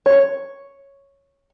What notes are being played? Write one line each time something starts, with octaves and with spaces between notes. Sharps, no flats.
C#5